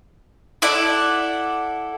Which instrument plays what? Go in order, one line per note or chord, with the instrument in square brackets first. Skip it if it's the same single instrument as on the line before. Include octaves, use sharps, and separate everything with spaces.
[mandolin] E4 A4 D5 F#5